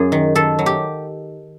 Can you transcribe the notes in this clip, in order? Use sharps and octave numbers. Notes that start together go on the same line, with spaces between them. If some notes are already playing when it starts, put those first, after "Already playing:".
Already playing: F#2 F#3 G#4
D#3
D#3 A4
F#3
G4